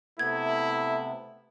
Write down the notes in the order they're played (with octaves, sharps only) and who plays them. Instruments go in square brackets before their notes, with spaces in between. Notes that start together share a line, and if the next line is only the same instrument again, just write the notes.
[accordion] C3 B3 [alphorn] A3 [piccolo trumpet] E4 [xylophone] G#6